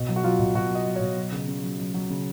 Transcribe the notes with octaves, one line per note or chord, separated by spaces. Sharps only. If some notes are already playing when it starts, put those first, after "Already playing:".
Already playing: B2
F#3
F#4
F#3 F4
B2
B2 F#4
F#3 D#5
F#3
C#5
B2
F#3
C#3
C#3
F#3
F#3
F#3
C#3